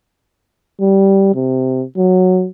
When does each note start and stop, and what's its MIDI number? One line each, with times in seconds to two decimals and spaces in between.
0.81 1.30 55
1.35 1.83 48
1.97 2.47 54